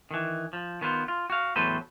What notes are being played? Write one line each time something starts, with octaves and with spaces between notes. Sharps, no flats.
D#3 E3
F3
D#3 B3 F4 C5
F4
F#4 F5
E2 A2 F#3 A4 B4 C5